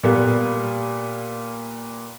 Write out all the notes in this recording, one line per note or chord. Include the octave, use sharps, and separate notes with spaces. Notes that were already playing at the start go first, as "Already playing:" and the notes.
A#2 G3 A#3 B3